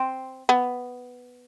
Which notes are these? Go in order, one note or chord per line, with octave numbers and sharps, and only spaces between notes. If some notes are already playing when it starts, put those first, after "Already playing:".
Already playing: C4
B3